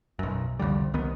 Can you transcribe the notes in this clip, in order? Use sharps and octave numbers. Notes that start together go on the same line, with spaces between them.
B1 F#2
C2 F2 D3 G3
C2 D#3 B3